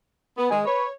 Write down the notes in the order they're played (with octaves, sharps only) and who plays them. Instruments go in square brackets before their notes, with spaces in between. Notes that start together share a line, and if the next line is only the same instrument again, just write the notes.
[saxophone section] B3
[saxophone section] D#3 G#3 [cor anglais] G#5
[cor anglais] B4 [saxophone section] C#5